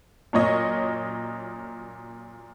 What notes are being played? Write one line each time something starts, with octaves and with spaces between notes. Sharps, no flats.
F#2 A#2 C#5 D#5